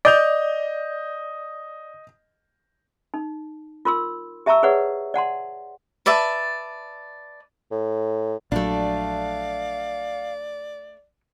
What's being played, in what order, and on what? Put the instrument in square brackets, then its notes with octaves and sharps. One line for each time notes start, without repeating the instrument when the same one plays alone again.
[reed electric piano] D5 [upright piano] D#5 G6 F7
[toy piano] D#4
F4 A#4 C6 E6
G4 E5 A5 A#5 C#6 E6
G#4 B4 C#5 D5 F#5
D5 F#5 A5 C6
[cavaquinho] B4 D5 E5 A5
[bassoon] A2
[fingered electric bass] A#1 F#3 [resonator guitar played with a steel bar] A3 D4 [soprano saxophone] D5 [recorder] F5